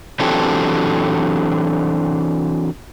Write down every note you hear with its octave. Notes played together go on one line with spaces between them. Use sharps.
E3 F#3 C4 D4 G4 A4